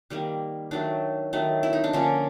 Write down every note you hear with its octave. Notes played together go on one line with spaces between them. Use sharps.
D#3 G3 A#3
D#3 F#3 A3 D4
D#3 F#3 A3
E4
D#4
D4
D3 F3 A#3 C#4